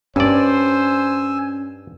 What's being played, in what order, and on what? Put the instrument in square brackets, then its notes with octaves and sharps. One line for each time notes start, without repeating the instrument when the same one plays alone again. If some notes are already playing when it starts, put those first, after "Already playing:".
[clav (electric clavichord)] G2 D5 [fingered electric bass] C#4 [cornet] C5 [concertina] G#5 E6